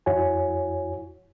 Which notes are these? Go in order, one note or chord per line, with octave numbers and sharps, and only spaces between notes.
F2 E4 F#4 C#5 G#5